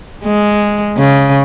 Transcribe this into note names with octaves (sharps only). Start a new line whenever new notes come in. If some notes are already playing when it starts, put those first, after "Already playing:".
G#3
C#3